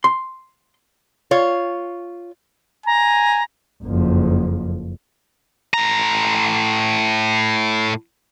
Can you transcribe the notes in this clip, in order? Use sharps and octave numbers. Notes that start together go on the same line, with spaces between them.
C6
F4 C#5
G#5 A#5
F#1 F2
A2 A#5